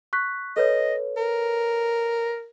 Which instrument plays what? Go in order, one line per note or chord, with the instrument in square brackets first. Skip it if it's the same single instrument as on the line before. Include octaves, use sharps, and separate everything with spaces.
[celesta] C#6 F#6 B6
[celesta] A4 B4 C#5 [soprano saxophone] D#5
[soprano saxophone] A#4